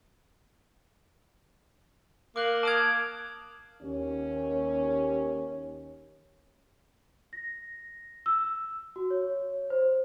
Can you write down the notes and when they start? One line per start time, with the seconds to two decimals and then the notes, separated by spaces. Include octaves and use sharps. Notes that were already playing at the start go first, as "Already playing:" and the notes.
2.36 A#3 D6 F#6 F#7
2.63 A5 D6 D#6 F6 G#6
3.81 D#2 C#4
7.33 A#6
8.26 E6
8.96 F#4
9.10 C#5
9.70 C5